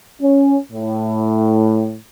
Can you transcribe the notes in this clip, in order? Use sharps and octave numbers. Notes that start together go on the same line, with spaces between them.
C#4
A2